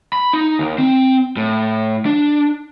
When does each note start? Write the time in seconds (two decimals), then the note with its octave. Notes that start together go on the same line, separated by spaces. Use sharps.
0.13 B5
0.33 D#4
0.59 D#2
0.78 C4
1.37 A2
2.06 D4